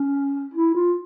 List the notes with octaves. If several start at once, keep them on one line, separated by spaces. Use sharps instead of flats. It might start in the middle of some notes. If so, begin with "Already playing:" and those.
Already playing: C#4
E4
F4